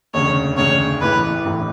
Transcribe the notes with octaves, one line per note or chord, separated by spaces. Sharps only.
E1 D2 C#3 C#5
E1 D2 C#3 C#5
A1 A2 E3 B4
A1 A2 E3